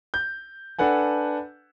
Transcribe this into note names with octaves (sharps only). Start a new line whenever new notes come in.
G6
D4 A4 B4 F#5 G#5